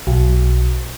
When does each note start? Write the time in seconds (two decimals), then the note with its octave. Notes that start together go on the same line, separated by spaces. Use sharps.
0.07 B1